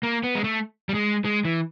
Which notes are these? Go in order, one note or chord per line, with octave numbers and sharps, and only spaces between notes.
A#3
B3
G#3
A3
G3
G#3
G#3
E3